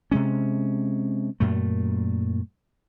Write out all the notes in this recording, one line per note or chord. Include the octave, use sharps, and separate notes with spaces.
C3 G#3 C#4
F#2 A#2 A3